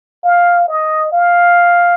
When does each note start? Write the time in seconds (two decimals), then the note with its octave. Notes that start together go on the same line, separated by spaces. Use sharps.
0.24 F5
0.68 D#5
1.13 F5